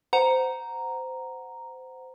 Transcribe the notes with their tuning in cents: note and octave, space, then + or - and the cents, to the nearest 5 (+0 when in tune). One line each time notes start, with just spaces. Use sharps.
C5 -20 F#5 +0 A#5 +0